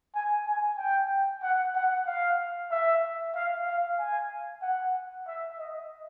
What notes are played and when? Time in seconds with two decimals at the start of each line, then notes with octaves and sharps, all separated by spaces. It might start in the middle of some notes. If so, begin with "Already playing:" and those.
0.15 G#5
0.46 G#5
0.78 G5
1.42 F#5
1.75 F#5
2.06 F5
2.71 E5
3.35 F5
3.67 F5
3.99 G#5
4.62 F#5
5.27 E5
5.58 D#5